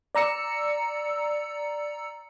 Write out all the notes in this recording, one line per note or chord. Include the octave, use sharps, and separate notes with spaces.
D5 A#5 E6 C#7